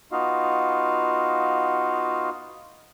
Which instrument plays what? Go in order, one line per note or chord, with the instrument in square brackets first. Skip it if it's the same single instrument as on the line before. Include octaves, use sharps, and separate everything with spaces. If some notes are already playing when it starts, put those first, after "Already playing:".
[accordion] B3 D#4 F4 F#4 D#5 F5